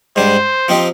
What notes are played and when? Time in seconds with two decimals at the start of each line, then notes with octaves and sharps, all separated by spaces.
0.16 G#2 G3 D4 C5
0.68 F3 C4 D#4 G4